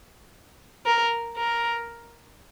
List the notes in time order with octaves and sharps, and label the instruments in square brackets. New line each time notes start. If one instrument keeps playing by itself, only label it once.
[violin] A#4
A#4